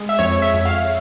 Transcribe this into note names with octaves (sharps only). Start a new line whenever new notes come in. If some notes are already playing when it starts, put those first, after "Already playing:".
Already playing: G#3
E5
F2 C#5
E5
F2
F5